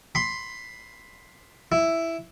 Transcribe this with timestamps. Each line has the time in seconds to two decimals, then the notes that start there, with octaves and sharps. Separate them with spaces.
0.15 B5 C6
1.72 E4